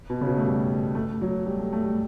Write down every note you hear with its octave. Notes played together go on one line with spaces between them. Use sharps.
B2
C#3
B2
A3
G3
A3
F#3
G3
A3
A3
G3